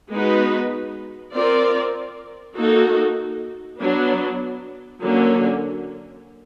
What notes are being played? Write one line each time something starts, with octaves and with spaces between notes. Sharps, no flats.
G#3 B3 D#4 F#4 B4
C4 F4 A#4 D5
A#3 D#4 F#4 A4
F#3 B3 D4
D3 F#3 A#3 C#4